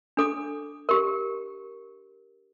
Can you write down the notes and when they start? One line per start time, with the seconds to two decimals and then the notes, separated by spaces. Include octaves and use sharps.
0.17 D4 A4 D6
0.89 G4 A#4